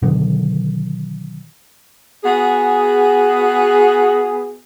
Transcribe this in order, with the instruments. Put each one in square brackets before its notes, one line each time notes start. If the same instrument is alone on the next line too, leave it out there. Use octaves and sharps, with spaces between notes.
[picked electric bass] B2 D3 D#3 F#3
[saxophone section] B3 F#4 G#4